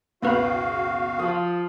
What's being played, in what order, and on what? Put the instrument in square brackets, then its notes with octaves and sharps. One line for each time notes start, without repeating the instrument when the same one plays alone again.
[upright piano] F#1 C#2 B2 [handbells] A#3 B4 B5 [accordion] F#4 F5
[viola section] F3 [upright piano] D#6